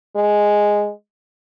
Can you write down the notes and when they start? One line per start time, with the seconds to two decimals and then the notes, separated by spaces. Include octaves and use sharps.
0.16 G#3